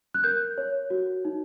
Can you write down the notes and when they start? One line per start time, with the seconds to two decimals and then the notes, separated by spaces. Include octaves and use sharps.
0.14 F#6
0.24 A#4 G6
0.58 C#5
0.90 F#4
1.25 D#4